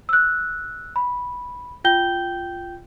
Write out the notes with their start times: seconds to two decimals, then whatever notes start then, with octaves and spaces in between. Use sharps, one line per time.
0.09 E6 F#6
0.96 B5
1.84 F4 G5 G6 G7